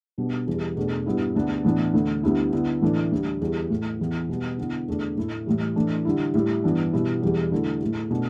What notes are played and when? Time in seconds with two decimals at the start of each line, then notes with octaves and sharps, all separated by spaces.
0.18 B2 G3 B3 D4
0.47 E2 E3 G3
0.77 E2 B2 A3 D4
1.06 G2 G3 B3 E4
1.35 D2 D3 B3 D4
1.65 A2 E3 B3 D4
1.94 D2 D3 A3
2.23 D2 D3 G3 B3 E4
2.53 D3 B3 E4
2.82 A2 E3 A3 D4
3.11 D2 D3 G3
3.41 E2 E3 G3
3.70 A2 A3 E4
3.99 E2 E3 B3
4.29 B2 G3 B3
4.58 D3 B3 E4
4.88 E2 D3 A3 D4
5.17 A2 A3 E4
5.46 A2 E3 G3
5.76 A2 E3 A3 D4
6.05 D3 G3 E4
6.34 A2 G3 E4
6.64 G2 E3 B3 D4
6.93 B2 G3 B3 E4
7.22 E2 E3 G3
7.52 D3 A3 E4
7.81 A2 A3 E4
8.10 B2 A3 D4